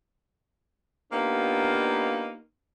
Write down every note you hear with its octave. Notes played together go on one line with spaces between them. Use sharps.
A#3 B3 D4 D#4 F4 G4